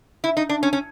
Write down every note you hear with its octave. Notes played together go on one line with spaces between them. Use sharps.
E4
D#4
D4
C#4
C#4